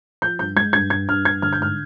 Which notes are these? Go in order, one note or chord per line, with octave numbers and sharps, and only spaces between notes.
F3 G6
G2 G6
G#3 G#6
G2 G#6
G2 G#6
G2 F6
G2 G#6
D3 F6
G6
G#2 F6